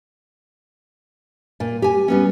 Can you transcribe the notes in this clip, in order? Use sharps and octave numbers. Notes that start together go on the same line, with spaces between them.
A#2
G4 G#5
G3 B3 C#4